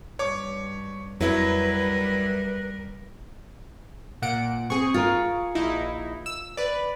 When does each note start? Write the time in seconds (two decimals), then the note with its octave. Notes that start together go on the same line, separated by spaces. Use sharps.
0.19 G2 C#5 D6
1.21 F2 F#3 G3 E4 A#4 B4
4.22 A#2 F#5 D7
4.70 C4 G#4 C#6
4.94 F4 A#4
5.55 A#1 D#4 E4
6.26 E6
6.57 B4 D5